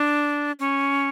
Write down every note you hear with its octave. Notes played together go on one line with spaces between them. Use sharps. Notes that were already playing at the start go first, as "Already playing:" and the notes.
Already playing: D4
C#4